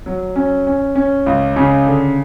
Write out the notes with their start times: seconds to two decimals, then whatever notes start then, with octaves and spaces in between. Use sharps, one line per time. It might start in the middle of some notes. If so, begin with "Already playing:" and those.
0.06 F#3
0.36 C#4
0.67 C#4
0.96 C#4
1.26 C#2
1.56 C#3
1.86 D3